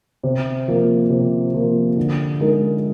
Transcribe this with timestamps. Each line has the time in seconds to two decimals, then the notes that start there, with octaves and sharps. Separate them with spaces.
0.23 C3
0.68 F3 A#3
1.10 C3
1.54 F3 A#3
1.97 D3
2.41 G#3 D#4 A#4